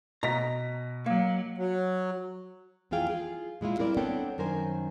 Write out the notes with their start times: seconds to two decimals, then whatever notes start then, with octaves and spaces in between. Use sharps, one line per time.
0.23 B2 D#5 A#5 B6
1.06 F#3 A#3
1.58 F#3
2.91 F2 E3 F4 G#4 F5 G5
3.09 F4 G#4
3.61 A#2 G#3 E4 F4
3.79 G3 C4 E4 A#4 B4 D5
3.97 B3 C4 D4 A4 C#5 G5
4.38 F#2 D#3 A#4 C5 G#5